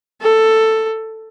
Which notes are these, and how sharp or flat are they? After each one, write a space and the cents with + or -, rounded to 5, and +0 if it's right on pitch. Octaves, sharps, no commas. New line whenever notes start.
A4 +10